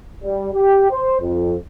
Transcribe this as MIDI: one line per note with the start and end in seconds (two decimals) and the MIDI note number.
0.23 0.48 55
0.53 0.89 67
0.90 1.19 72
1.21 1.54 41